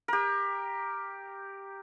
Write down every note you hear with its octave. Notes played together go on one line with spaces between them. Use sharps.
G4 A#4